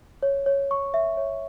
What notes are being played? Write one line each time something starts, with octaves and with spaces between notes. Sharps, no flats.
C#5
C#5
C#6
E5
C#5